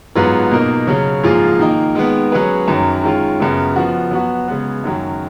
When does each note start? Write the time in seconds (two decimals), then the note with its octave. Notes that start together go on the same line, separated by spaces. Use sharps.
0.15 G#2 F#3 B3 F4 B4
0.51 B2 A#3 D#4 A#4
0.87 C#3 F#3 C#4
1.23 G#2 F3 A#3 F4 G#4
1.59 D#3 A#3 D#4
1.95 D#3 G#3 B3
2.32 F#3 C#4 G#4 B4
2.68 F#2 D#3 F#3
3.04 D#3 G#3 C#4 F4
3.40 F#2 C#3 F#3 B3
3.76 F3 B3 F#4
4.11 F#3 B3 F#4
4.48 C#3 G#3 B3
4.84 F#2 D#3 F#3